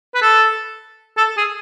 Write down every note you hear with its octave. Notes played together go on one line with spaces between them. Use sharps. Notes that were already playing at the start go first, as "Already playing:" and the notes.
B4
A4
A4
G#4